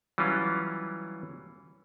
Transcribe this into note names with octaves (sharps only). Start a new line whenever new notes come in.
E3 F#3 G3 C#4 F4